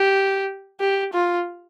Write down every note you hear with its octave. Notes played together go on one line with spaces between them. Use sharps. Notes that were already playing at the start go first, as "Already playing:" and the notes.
Already playing: G4
G4
F4